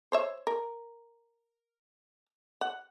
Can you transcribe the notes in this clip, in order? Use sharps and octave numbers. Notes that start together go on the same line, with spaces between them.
C5 C#5 E5
A#4
F#5